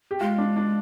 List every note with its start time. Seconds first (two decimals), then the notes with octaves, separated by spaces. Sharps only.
0.11 G4
0.20 G#3 F4
0.38 D4
0.56 D4